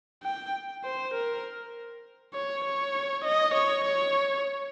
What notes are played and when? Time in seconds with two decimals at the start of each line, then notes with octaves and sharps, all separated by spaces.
0.23 G5
0.84 C5
1.14 A#4
2.34 C#5
2.65 C#5
3.25 D#5
3.54 C#5
3.84 C#5